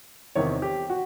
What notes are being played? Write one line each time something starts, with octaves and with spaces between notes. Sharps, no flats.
E2 C3 D#3 C#5
G4
F#4